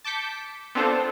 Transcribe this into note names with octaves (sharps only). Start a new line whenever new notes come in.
A5 D6 G6 B6 C#7
B3 C4 D4 F4 A4 C5